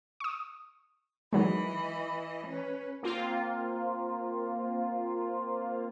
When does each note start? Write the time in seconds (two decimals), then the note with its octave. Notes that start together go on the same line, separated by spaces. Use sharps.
0.20 C#6 D#6
1.33 D#3 E3 F#3 G#3 D#5 B5
2.47 C#4 B4
3.03 A#3 C4 F4